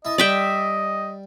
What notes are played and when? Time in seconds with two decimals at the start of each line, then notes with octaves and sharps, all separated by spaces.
0.05 E4 D#5 A5
0.18 G3 D5 E5 G5